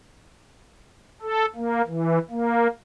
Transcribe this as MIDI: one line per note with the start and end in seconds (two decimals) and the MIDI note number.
1.22 1.45 69
1.56 1.82 58
1.87 2.19 52
2.30 2.67 58